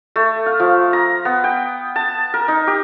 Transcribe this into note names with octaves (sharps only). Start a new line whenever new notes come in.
A3
F5
F3
A#5
B3
G5
A5
A#4
D#4
G4